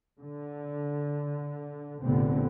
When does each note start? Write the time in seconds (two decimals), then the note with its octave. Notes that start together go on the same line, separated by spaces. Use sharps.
0.20 D3
2.03 F1 A#1 D3 B3 C4